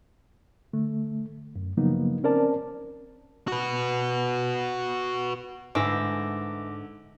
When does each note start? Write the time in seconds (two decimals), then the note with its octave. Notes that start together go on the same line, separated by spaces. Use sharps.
0.73 D3 A3
1.56 F#2
1.77 C#3 F3 F#3 A#3 B3 D#4
2.24 C4 C#4 A#4 C5 D5 A5
3.48 F#4 B4
5.75 G#2 D3 E3 A3 D6 E6 A#6